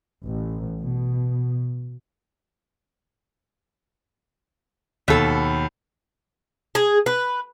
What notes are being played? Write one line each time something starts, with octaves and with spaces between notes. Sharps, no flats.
A1
B2
D#2 B2 A4
G#4
B4